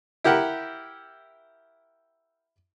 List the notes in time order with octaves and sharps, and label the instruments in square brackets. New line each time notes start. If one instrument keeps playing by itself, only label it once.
[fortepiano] E4 G4 A#4 F#5